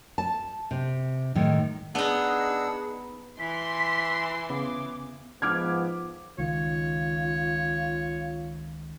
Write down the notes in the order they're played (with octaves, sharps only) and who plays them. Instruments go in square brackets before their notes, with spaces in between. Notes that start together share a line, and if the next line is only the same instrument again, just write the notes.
[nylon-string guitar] A5
C3
A2 D#3 G#3
[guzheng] B3 D#4 [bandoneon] D4 F#5 E6 [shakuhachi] G#4
[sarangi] E3 [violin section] C6 [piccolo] B6
[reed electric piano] C#3 B3 [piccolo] D6
[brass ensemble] G#2 F3 B3 [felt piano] D6 F6 G#6
[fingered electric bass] C#2 D#3 [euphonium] F4 [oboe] C#5